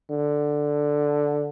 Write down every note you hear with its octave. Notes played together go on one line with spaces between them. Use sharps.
D3